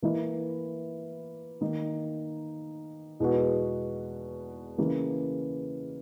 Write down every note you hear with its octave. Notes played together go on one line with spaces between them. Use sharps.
E3 A#3 E4
D#3 A#3 D#4
E2 B2 G#3 B3 F#4
C#3 E3 A#3